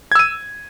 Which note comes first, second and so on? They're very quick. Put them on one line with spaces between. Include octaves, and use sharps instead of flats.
G#6 E6 D#7